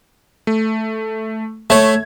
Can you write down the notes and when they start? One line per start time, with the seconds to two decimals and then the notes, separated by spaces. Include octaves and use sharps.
0.47 A3
1.70 A3 C#5 E5 G#6